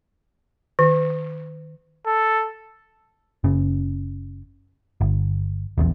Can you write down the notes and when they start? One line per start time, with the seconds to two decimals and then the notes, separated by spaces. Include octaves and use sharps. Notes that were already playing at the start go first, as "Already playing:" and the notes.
0.79 D#3
2.07 A4
3.44 F#1 C#3
5.01 G1
5.78 D#1 A#1 E2